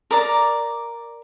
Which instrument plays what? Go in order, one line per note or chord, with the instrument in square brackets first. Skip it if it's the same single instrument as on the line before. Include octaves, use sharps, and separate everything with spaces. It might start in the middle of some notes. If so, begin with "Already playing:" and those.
[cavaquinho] A#4 D5 A#5 D6